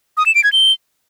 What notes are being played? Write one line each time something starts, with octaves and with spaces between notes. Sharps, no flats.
D#6
E7
D7
G#6
G7